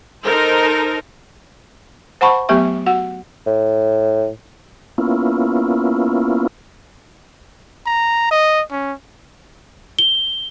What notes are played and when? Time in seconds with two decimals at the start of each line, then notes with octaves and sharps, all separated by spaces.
0.22 D#4 A4 A#4 C5
2.21 C5 F#5 A5 B5 C#6
2.49 F#3 A3 B3 G4 E5 C#6
2.86 F#4 F#5
3.47 A2
4.98 A#3 B3 C#4 E4 F4
7.86 A#5
8.31 D#5
8.72 C#4
9.99 G7